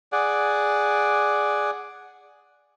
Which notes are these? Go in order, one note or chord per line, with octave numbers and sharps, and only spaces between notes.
G#4 D5 F#5